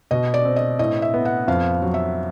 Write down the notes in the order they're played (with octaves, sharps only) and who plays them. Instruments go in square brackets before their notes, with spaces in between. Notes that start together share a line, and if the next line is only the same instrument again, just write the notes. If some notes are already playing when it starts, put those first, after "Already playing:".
[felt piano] B2 D#5
D5
C4
D#5
A2 D#5
E5
B3
F#5
F2 F5
F#3
E5